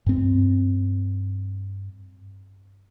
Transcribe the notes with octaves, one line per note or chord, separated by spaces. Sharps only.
G2 C4